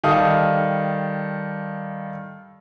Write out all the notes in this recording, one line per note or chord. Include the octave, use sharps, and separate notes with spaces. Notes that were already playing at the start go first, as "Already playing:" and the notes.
D#3 G3 A4 F5 D#6